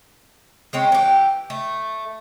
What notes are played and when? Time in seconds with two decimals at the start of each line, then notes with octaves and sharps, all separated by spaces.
0.73 G#3 C4 C#4
0.92 E3 G4
1.50 A3